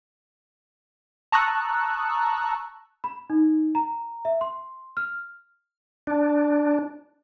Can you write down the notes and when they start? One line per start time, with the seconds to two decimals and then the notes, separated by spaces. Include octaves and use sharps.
1.32 A5 A#5 C#6 D#6 E6 F#6
3.04 B5
3.30 D#4
3.75 A#5
4.25 E5
4.41 C6
4.97 F6
6.07 D4